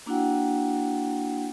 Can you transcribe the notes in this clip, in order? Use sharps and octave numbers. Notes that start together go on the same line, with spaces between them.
A#3 D4 E4 F#4 F#5 G5